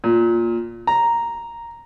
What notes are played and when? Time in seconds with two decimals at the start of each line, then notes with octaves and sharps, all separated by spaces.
0.04 A#2
0.87 A#5